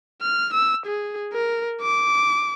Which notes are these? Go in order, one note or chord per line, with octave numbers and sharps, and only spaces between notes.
F6
E6
G#4
A#4
D6